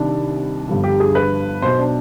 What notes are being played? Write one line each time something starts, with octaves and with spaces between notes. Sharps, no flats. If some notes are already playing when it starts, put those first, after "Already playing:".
Already playing: C2 C3 D#3 D4
G1 G2 D3 F3
G4
G#4
B4
B1 B2 C5
D4